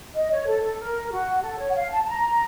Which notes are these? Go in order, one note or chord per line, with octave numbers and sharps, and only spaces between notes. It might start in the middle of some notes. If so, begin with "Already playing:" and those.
D#5
C#5
A4
A4
A#4
F#4
A4
C#5
F#5
F5
A5
A#5